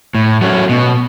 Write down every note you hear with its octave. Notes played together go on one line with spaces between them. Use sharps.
A2
F#3 A3 C#4
B2